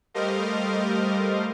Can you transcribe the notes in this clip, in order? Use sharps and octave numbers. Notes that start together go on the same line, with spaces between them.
G3 A3 A#4 C5 D#5 F5